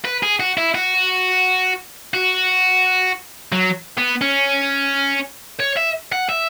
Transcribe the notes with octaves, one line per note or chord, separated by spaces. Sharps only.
B4
G#4
F#4
E4
F#4
F#4
F#3
B3
C#4
C#5
E5
F#5
E5